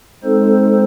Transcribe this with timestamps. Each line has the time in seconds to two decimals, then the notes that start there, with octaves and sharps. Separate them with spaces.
0.23 G#3 C4 D#4 A4 C5